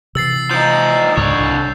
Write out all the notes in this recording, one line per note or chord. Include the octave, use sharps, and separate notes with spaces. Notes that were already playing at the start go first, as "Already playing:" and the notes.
C3 E3 E6 A6 C7
F3 D#4 G6
C#2 G#2 D3 C#5
C2